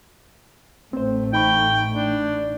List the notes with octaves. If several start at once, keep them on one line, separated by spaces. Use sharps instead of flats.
A1 A3 C4 C5
D#4 G5 B5 C#6
D4